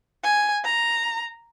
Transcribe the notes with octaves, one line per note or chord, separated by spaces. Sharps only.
G#5
A#5